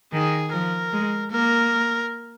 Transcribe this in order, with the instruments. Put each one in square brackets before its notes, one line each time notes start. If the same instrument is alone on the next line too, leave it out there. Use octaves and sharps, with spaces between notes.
[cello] D#3 [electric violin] G#4
[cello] F3 [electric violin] A#4
[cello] G#3
[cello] A#3 [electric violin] A#4